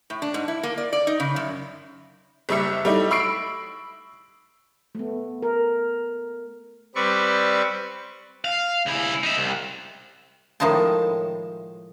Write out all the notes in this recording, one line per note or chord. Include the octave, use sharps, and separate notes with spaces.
A2
D4
G#2
E4
A#3
D5
D5
D#4
C#3
F#2
F#1 G3 E5 E6 C#7
G3 A3 D#4 E4
B5 C#6 E6 C7 D7
A3 B3
A#4
G3 C4 B4 D5 C#6
F5
C#2 E4
D#4 E5
C2
A2 D#3 F3 G#3 A5